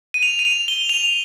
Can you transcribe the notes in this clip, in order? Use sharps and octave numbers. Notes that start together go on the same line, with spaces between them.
D#7
F7
D#7
F7
G7
F7